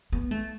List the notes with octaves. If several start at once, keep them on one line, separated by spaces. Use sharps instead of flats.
B3
A3